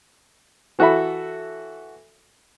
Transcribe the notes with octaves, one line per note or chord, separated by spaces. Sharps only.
E3 F#4 A4 E5 B5